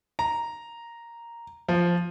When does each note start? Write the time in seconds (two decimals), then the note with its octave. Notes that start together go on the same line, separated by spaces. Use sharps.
0.19 A#5
1.69 F3